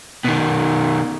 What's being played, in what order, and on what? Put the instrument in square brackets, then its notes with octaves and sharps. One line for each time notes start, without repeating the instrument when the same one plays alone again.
[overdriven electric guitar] B2 D#3